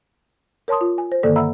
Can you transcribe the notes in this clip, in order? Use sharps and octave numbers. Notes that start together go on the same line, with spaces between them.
A#4 C#5 A5 C6 D#6
F4
G#5
C5
G2 D3 D#3 A#3 A4 D5
E5 F#5 A#5 B5 E6